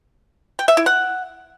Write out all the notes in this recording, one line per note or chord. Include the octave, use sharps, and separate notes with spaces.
G5
E5
E4
F#5